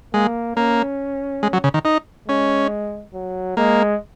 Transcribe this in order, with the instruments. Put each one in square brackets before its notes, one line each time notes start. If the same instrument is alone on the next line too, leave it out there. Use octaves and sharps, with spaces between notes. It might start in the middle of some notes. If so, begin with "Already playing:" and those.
[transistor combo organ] G#3 [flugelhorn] A#3
[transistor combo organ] A#3 [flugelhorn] C#4
[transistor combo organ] G#3
F#3
C#3
D#3
D#4
[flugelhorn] G#3 [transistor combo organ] C#4
[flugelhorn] F#3
[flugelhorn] G#3 [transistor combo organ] A#3